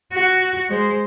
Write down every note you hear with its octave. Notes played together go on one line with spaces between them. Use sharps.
F#4
G#3 C5